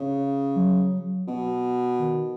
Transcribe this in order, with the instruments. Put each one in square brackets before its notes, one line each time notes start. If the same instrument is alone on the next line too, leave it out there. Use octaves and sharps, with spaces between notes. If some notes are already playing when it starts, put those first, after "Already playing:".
Already playing: [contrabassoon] C#3
[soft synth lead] F#3
[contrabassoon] B2
[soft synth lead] D#3